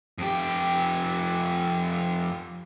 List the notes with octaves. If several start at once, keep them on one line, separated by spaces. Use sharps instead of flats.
F2 G4